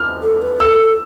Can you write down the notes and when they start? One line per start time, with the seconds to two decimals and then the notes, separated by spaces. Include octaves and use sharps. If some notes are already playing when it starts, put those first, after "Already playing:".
Already playing: F6
0.23 A4
0.42 B4
0.60 A4 E6